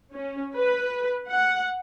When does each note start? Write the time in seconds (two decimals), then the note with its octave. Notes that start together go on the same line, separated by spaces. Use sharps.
0.14 C#4
0.57 B4
1.30 F#5